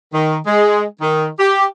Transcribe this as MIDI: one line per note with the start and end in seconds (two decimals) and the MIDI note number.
0.14 0.36 51
0.47 0.82 56
1.02 1.26 51
1.39 1.64 67